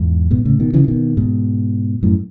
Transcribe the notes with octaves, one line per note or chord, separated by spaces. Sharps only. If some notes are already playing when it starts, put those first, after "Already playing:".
Already playing: E2 G#2
G#2 B2
A2 C#3
B2 D#3
C#3 E3
E3
B2 D#3
G#2 B2
F#2 A2